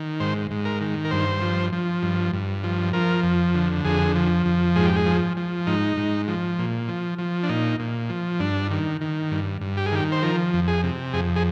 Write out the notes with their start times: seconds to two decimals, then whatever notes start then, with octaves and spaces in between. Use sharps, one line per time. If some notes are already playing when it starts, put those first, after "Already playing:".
Already playing: D#3
0.20 G#2 C5
0.51 G#2
0.65 A#4
0.81 D#3
1.05 A#4
1.11 G2 C5
1.42 F3
1.73 F3
2.02 G2
2.33 G2
2.64 F3
2.93 F3 A#4
3.23 F2
3.54 D3
3.85 F2 G#4
4.16 F3
4.46 F2
4.76 G#2 G#4
4.86 G4
4.96 G#4
5.06 F3
5.37 F3
5.67 G#2 D#4
5.97 G#2
6.28 F3
6.59 A#2
6.88 F3
7.18 F3
7.43 D4
7.49 A#2 D#4
7.79 A#2
8.09 F3
8.40 G2 D4
8.71 D#3
9.01 D#3
9.31 G2
9.61 G2
9.77 G4
9.86 G#4
9.92 D#3 G4
10.12 C5
10.23 F3 A#4
10.53 F2
10.68 G#4
10.83 C3
11.14 F2 G#4
11.36 G#4